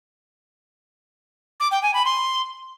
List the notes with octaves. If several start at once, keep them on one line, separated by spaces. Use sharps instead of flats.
D6
G5
G#5
B5
C6